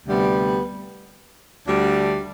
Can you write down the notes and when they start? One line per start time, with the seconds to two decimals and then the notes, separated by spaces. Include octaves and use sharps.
0.06 D2 C3 G3 B3
1.66 D2 D3 G3 D4